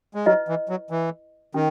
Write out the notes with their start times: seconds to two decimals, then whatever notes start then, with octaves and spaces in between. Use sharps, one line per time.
0.15 G#3
0.26 F#3 E4 B4 D#5
0.48 E3
0.69 F#3
0.90 E3
1.54 D#3 C#4